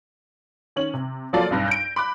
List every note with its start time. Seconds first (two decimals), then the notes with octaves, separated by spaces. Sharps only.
0.76 D#3 C#4 F#7
0.94 C3
1.33 F3 F#3 A#3 F4 A4 D5
1.51 B1 G2 A#6
1.68 G6 D7
1.96 B5 D6 F#6